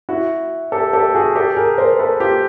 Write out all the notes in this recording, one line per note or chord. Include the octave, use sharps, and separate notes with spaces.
E4 F#4
G4 A4
G4 A4
F#4 G#4
G4 A4
G#4 A#4
A#4 C5
A4 B4
F4 G4